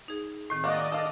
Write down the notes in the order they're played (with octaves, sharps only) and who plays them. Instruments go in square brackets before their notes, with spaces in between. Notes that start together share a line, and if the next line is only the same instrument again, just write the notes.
[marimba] D#4 G#4
A2 D#3 C4
[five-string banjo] G#3 A#3 F#4 [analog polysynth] D5 D#5
[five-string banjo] A4 F5